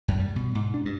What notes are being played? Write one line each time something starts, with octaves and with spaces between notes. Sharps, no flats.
F#2
G3
B2
G#2
D4
G2